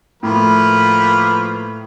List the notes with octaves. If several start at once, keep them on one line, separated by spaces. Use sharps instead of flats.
A2 F3 A#3 B4